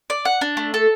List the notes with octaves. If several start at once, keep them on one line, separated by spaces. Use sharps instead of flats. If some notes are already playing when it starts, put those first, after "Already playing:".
D5
F#5
D4
A3
A4